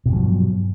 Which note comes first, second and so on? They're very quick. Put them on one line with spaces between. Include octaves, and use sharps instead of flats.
B2 G2 F3 F#3